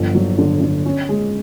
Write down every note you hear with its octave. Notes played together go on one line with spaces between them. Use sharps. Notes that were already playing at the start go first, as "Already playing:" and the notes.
Already playing: G1 F3
F#3
D3
D3
C#4
G#3